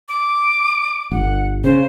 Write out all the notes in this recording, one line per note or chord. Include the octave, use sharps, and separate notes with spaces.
D6
G1 F#5
C#3 C5